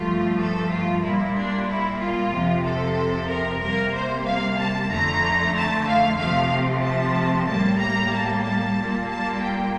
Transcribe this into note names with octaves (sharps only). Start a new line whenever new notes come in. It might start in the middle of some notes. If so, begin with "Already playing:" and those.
Already playing: G2 F3 A3 F4
A4
F4
A#2 G3 A#3 E4
D4
E4
F4
F2 C3 F3
A4
A#4
C3 G3 A#3 A#4
C5
F5
A5
F2 D3 A3 A#5
A5
F5
C3 F3 A3 F5
A5
A2 G3 A#3 A5
A#5
A5
A5
A#2 G3 A#3
A5
G5